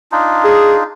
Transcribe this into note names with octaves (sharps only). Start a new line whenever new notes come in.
D4 D#4 F4
G#4